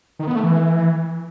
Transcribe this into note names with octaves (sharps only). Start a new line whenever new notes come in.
D#3
B3
A3
E3